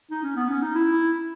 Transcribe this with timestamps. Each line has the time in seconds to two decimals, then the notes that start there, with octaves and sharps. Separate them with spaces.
0.11 D#4
0.23 C#4
0.36 B3
0.50 C#4
0.62 D#4
0.75 E4